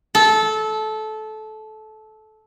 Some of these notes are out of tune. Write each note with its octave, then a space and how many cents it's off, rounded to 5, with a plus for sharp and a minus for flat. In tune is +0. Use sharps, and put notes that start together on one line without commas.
A4 -20